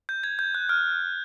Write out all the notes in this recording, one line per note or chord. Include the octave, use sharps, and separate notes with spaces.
G6
G#6
G6
F#6
F6